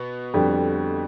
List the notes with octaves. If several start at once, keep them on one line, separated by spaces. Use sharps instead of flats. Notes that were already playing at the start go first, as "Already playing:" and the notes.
Already playing: B2 B3
F2 D3 G3